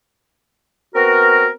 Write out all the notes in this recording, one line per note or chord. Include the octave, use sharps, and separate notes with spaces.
B3 C4 F#4 A#4